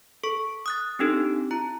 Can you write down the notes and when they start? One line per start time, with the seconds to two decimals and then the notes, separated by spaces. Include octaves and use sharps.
0.24 A4 C#6
0.66 D#6 F#6 A6
0.99 C4 D4 D#4 G4 A4
1.51 E4 A#5